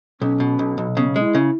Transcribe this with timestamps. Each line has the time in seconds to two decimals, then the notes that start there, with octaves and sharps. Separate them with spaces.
0.21 B1 C#4
0.40 B2
0.59 B1
0.78 B1
0.97 C#3 B3
1.16 G#3 C#4
1.22 E4
1.35 C#3